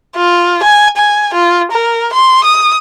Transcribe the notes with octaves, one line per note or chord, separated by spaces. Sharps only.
F4
G#5
G#5
F4
A#4
C6
D#6